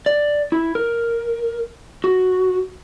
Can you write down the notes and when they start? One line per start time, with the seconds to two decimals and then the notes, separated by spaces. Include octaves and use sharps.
0.06 D5
0.52 E4
0.75 A#4
2.04 F#4